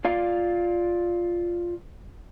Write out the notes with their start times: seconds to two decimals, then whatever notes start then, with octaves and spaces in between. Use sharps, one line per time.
0.05 F4 D5 F5